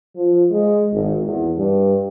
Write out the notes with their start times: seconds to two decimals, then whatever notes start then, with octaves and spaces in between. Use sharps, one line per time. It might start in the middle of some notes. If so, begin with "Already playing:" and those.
0.16 F3
0.51 G#3
0.92 G#1
1.25 E2
1.58 G2